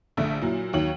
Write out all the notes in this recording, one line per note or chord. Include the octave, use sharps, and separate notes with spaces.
A#1 D3 A3 E5
A#2 F#3 E4
D#2 D#3 F#3 C#5 F#7